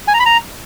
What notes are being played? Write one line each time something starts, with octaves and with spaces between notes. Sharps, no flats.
G#5
A#5
B5
A#5